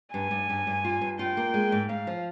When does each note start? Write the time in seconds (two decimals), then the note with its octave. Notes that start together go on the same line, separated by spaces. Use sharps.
0.14 G2 G#5
0.31 G2
0.50 G2
0.67 G2
0.85 F4
1.01 G2
1.19 F4 G5
1.37 A#3
1.54 G#3
1.72 G#2
1.89 G#2 F5
2.07 F3